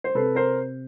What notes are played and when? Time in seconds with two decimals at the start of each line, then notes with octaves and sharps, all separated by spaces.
0.04 C5
0.15 C3 A4 B4
0.35 A#4 C5